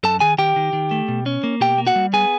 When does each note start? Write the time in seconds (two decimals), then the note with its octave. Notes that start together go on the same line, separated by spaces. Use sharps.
0.03 F#2 A4 A5
0.20 D#3 G#4 G#5
0.38 D#3 G4 G5
0.56 D#3
0.73 D#3
0.91 A3
1.08 B2
1.26 C#4
1.44 A#3
1.61 B2 G4 G5
1.78 A#3
1.87 F#4 F#5
1.96 G3
2.13 B3 G#4 G#5